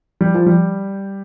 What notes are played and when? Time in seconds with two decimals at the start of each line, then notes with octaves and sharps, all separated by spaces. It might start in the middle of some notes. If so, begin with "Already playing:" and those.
0.21 G3
0.34 F3
0.46 G3